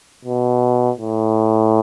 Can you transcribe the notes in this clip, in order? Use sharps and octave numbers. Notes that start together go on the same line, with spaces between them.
B2
A2